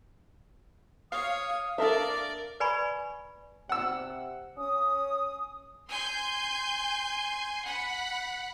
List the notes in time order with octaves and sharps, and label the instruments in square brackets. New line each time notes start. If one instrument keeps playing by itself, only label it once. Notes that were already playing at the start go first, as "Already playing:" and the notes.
[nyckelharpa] C#5 [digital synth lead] F5 [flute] D#6
[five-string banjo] D4 A4 E5 [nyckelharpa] A#4 D5
[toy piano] B4 D5 G#5 A#5 B5 C#6
[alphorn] C3 [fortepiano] F#5 E6
[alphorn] C#4 [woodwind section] D#6
[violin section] G#5 C6 G6
F#5 B5